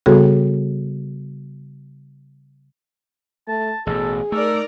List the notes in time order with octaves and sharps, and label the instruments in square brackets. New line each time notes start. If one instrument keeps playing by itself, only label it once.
[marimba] C#3 G3 B3 F#4 G#4 A4
[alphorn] A3 [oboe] A5
[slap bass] A1 B2 [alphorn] G#4 [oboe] A4
[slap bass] A3 [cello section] D#4 A#4 D5 [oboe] E6